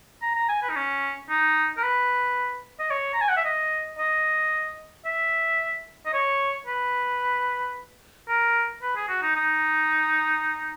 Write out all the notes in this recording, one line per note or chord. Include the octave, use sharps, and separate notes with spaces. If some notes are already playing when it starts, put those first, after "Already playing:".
A#5
A#5
G#5
B4
D#4
C#4
D#4
A#4
B4
D#5
C#5
A#5
G#5
F#5
E5
D#5
D#5
E5
D#5
C#5
B4
A#4
B4
G#4
F#4
D#4
D#4